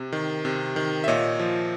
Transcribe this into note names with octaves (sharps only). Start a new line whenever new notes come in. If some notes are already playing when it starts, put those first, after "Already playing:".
Already playing: C3
D#3
C3
D#3
E5
A#2 C#5 D#5
F3